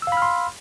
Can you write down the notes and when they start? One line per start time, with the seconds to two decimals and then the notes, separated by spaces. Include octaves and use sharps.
0.02 E6
0.07 F5
0.12 B5
0.17 F6
0.22 C6